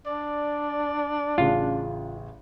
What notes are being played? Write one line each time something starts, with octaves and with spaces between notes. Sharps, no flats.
D4 D5
A1 C#3 F4